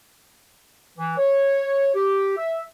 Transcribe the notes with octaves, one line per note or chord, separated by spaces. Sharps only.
E3
C#5
G4
E5